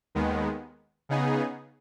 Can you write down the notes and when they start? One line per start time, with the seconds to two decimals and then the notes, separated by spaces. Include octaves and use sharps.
0.15 D#2 D#3 G#3 B3
1.09 C#3 B3 D#4 G#4